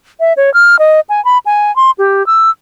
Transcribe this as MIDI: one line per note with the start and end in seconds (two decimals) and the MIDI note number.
0.20 0.33 76
0.37 0.53 73
0.54 0.79 89
0.79 1.00 75
1.09 1.23 80
1.25 1.38 83
1.46 1.74 80
1.76 1.91 84
1.98 2.25 67
2.27 2.50 88